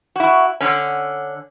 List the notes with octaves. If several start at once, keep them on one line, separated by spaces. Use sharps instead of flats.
E4 F#4
D3 C#4